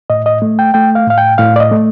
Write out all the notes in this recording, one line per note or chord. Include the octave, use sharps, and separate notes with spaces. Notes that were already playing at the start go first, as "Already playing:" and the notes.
A2 D#5
D#5
A3
G5
A3 G5
F5
A2 F5
G5
A2 F5
D5
D#5
A3